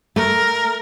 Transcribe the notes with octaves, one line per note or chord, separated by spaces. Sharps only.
A3 A#4